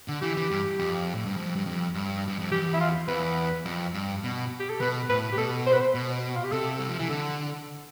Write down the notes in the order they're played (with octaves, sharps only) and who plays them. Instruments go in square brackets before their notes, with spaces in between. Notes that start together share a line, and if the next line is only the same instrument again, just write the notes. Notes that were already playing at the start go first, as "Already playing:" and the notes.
[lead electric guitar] D3
[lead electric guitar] E3 [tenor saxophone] G4
[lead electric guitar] E3
G2
F2
A2
G2
F2
G2
F2
G2
G2
F2
[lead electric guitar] E2 [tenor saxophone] G4
[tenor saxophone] E4
F4
[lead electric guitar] E2 [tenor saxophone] B4
[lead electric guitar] F2
G2
B2
[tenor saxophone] G4
A4
[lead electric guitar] B2 [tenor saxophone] B4
[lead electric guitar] A2 [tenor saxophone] B4
[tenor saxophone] G4
[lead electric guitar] B2 [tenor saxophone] A4
[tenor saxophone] C5
B4
C5
[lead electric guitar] B2
[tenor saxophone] F4
G4
[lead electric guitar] C3 [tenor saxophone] A4
[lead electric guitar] G3
F3
E3
[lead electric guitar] D3 [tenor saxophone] A4